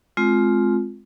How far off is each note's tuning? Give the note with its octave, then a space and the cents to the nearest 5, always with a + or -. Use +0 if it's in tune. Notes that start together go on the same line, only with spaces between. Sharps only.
G#3 +30 C4 +0 F4 +0